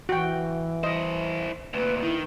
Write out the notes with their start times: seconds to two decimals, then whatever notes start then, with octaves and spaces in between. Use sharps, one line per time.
0.09 E3 F#4 G5
0.84 E4 C5 D#5
1.74 D2 A#2 B4
2.03 D#3 E4